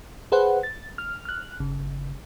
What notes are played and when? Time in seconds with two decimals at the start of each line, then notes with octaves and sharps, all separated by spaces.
0.32 G#4 B4 C5 F#5
0.63 A6
0.98 F6
1.25 F6 F#6
1.59 G1 C#3